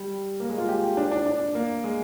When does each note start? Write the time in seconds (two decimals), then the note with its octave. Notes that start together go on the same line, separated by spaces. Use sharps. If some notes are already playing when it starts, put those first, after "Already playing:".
Already playing: G3
0.40 A#3
0.49 G#3
0.58 F4
0.68 G4
0.97 D4
1.12 D4
1.26 D4
1.55 A#3
1.84 G#3